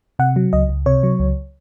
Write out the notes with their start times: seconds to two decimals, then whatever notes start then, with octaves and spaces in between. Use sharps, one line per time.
0.19 C3 F#5
0.36 F#3
0.53 C#2 D#5
0.69 C#2
0.86 C3 C#5
1.03 F#3
1.20 C#2